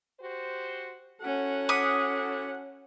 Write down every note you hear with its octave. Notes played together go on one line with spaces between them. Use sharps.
F#4 G4 C5
C#4 E4 F#4 A4 F#5
D6 D#6 B6 C#7